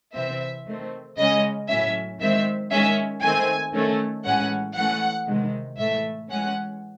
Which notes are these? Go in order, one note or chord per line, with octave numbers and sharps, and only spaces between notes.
C3 E3 C4 E5
D#3 A3 C4
C#3 G#3 C#4 D#5
A2 F#3 C#4 E5
D#3 G#3 C4 E5
D#3 G#3 C#4 E5
D#3 A3 C4 G#5
D#3 A3 C#4
A2 E3 G#3 C#4 F#5
E3 A3 C#4 F#5
C3 D#3 G#3
A2 E3 A3 E5
E3 G#3 C#4 F#5